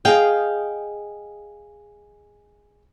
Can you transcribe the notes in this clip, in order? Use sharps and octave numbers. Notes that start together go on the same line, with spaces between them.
G#4 D#5 F5 G5